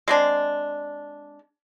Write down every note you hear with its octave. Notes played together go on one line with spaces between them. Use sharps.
G#3 C4 D4